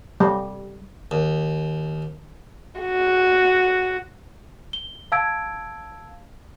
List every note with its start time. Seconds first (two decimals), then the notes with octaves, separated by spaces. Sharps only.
0.20 G3
1.11 D#2
2.80 F#4
4.73 G7
5.12 F5 A5 E6 G#6 D7